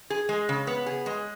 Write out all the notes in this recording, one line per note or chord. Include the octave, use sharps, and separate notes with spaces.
G#4
G#3
C#3
B3
G#4
G#3